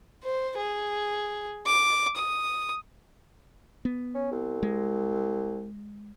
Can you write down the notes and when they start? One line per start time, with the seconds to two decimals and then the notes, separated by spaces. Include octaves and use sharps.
0.24 C5
0.58 G#4
1.66 D6
2.17 D#6
3.85 B3
4.14 C#4
4.32 C2
4.63 G#3